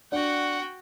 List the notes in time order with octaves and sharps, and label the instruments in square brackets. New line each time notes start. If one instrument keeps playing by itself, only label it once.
[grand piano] D4 [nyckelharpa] F#4 G5 [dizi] F#5